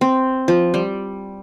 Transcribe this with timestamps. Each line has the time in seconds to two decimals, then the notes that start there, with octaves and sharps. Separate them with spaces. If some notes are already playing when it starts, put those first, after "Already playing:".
0.01 C4
0.48 F3
0.74 G3